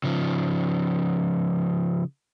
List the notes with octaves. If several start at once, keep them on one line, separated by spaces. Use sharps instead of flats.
C#3 F3